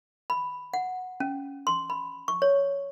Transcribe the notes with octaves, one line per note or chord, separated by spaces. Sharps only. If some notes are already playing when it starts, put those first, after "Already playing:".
B5
F#5
C#4
C6
B5
C#6
C#5